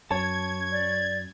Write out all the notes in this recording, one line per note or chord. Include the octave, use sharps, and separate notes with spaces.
F#2 C#5 A5 G#6
D5